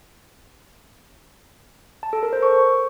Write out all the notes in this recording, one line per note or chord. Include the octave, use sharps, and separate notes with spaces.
A5
A4
A#4
C5
C#6